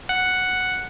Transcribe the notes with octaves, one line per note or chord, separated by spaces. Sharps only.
F#5